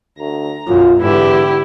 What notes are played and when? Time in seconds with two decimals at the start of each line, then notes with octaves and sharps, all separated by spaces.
0.19 D2 A#5
0.67 B1 F#2 F4
1.01 E2 G#2 D3 E4 G4